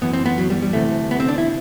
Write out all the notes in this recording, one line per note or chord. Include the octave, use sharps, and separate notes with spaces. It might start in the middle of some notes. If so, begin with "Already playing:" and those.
F#2 E3 B3
C4
B3
F#3
G3
G3
D2 C3 E3 A3
B3
C4
D4
E4